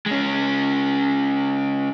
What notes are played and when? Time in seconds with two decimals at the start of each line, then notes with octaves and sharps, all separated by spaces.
0.06 G#3 C#4